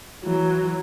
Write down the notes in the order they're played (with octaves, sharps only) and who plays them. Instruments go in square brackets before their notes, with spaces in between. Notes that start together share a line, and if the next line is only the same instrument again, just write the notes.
[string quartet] E3 F#3